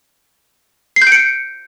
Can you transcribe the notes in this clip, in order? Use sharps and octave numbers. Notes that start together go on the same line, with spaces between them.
C7
G6
D7
C#7